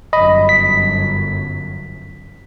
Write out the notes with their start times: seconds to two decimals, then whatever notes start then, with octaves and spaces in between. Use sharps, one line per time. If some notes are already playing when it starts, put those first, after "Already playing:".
0.13 G1 F#2 D#5 B5
0.49 B6